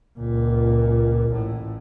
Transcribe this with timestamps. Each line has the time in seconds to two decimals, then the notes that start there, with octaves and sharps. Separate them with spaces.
0.19 C#2 A#2
1.30 A1 A2